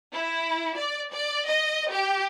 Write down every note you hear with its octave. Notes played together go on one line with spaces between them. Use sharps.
E4
D5
D5
D#5
G4